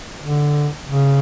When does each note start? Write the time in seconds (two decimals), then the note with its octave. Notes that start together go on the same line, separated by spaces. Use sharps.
0.23 D3
0.86 C#3